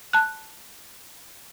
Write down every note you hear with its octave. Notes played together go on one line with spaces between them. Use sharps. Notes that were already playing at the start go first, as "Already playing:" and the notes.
A5 F#6